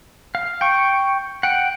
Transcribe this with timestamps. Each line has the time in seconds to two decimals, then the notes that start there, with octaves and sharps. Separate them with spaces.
0.35 F5
0.61 G5 C#6
1.43 F#5 G5